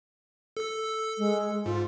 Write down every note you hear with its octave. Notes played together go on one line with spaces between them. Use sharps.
A4 E6
G#3
G#2 F4